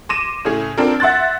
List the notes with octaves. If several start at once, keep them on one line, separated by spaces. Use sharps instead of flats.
C6 D6 A#6 D#7 E7
A2 C#3 A3 C#4 G#4
C4 D4 F4 A4 A#4
E5 F#5 C6 F#6 A6